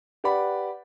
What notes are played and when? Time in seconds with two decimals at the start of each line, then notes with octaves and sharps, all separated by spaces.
0.24 G4 B4 D5 F#5 B5